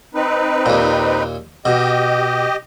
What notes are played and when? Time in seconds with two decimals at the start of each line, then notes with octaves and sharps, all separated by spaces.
0.14 C4 D#4 B4
0.66 D#2 A#2
1.65 B2 G4 D#5